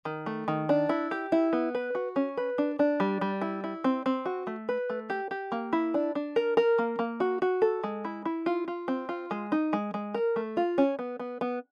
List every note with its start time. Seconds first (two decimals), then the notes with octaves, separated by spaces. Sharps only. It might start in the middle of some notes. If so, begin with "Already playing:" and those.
0.05 D#3
0.26 A3
0.48 D#3
0.69 D4
0.89 E4
1.11 G4
1.32 E4
1.53 B3
1.75 B4
1.95 F#4
2.16 C#4
2.37 B4
2.58 D4
2.79 D4
3.00 G3
3.21 G3
3.41 E4
3.64 E4
3.84 C4
4.06 C4
4.26 F#4
4.47 A3
4.69 B4
4.90 A3
5.10 G4
5.31 G4
5.52 A#3
5.73 E4
5.94 D4
6.15 D4
6.36 A#4
6.57 A#4
6.78 A#3
6.99 A#3
7.20 F#4
7.42 F#4
7.62 A4
7.84 G#3
8.05 E4
8.25 E4
8.46 F4
8.68 F4
8.88 C4
9.09 F4
9.31 G#3
9.52 D#4
9.73 G#3
9.94 G#3
10.14 A#4
10.36 A3
10.57 F4
10.78 C#4
10.99 B3
11.20 B3
11.41 B3